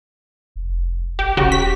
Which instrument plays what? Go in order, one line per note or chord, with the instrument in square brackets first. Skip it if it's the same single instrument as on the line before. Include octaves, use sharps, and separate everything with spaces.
[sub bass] F1
[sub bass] A1 [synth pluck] G4
[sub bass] D#1 [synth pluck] C#3 F#4 G4
[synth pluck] B6